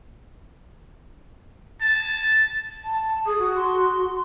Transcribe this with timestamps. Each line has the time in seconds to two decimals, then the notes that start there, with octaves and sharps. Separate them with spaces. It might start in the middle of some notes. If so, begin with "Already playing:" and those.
1.81 A5
2.85 A5
3.26 G#4 D#6
3.39 F#4
3.56 C6